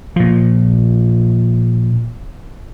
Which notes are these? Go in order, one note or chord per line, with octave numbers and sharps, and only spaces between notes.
A#2 F3